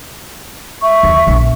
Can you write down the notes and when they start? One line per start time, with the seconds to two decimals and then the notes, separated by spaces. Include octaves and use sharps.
0.83 E5 C#6
1.03 D#2 D#3
1.27 A#1 B3